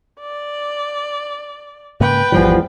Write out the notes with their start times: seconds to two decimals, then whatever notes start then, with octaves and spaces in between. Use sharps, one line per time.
0.20 D5
2.00 G#2 C#3 A#3 B4 G5
2.32 G#1 E2 E3 F3 G3